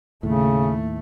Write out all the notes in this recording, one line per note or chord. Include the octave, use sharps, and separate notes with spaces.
D#2 A2 C#3 A3